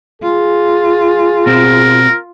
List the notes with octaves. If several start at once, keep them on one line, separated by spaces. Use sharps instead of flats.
F4 G#4
B2 C4 A#4